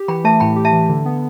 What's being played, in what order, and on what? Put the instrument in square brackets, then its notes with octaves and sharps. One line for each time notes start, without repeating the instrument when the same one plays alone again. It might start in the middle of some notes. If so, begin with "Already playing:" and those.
Already playing: [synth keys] G4
[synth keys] E3 [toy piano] G5 B5
[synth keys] A3 [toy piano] E5 A5
[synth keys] A2 [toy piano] G5 B5
[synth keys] G4
[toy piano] E5 A5
[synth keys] E3
D3
B3